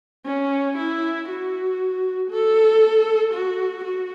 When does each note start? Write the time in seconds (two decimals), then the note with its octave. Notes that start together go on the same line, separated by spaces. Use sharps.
0.25 C#4
0.78 E4
1.29 F#4
2.31 A4
3.34 F#4
3.85 F#4